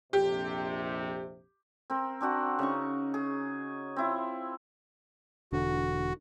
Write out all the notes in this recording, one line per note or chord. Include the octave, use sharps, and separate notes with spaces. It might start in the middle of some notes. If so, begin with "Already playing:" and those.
A#1 F2 C3 G4
C4 A#4
C4 D4 F#4 F#5
C#3 C#4 D#4 C#6
G#4
C4 E4 F4
E1 D3 F#4